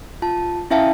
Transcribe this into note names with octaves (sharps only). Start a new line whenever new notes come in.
F4 A5
C#4 E4 E5 F5 G5 A5